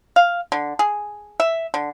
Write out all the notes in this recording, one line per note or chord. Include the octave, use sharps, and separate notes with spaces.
F5
D3
G#4
E5
D3